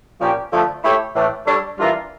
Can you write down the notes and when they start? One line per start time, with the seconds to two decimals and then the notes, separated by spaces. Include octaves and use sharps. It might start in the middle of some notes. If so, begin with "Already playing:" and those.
0.20 A#2 F3 A#3 C#4 G4
0.52 D3 F3 A3
0.83 A3 E4 G4 C#5
1.14 A2 E3 A3 D4
1.46 G3 D4 A4 C#5
1.77 E3 G3 D4 F4 A#4